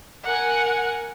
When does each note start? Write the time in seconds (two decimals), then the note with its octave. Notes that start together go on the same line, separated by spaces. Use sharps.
0.24 A#4 F#5 G#5